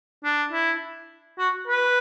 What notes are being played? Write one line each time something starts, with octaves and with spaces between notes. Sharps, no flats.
D4
E4
F#4
B4